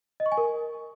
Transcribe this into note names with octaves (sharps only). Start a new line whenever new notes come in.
D#5
C#6
G#5
A#4